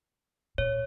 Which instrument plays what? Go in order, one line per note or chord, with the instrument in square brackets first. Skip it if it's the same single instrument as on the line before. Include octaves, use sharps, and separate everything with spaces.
[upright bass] A#2 [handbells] C#5